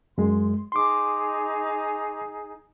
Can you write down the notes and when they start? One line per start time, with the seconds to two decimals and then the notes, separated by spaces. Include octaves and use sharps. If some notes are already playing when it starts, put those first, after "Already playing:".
0.18 F#2 G#3 C6
0.72 D#4 G#4 C6 D6